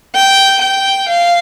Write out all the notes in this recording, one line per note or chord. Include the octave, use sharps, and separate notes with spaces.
G5
G5
F5